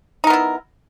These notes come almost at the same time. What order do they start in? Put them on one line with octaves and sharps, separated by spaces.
D#4 A#4 B3 E4